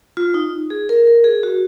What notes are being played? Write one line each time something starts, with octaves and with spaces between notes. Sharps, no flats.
F4
D#4
G#4
A#4
A#4
G#4
F#4